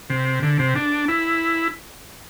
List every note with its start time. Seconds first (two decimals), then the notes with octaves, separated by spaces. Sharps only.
0.10 C3
0.43 D3
0.59 C3
0.76 D4
1.08 E4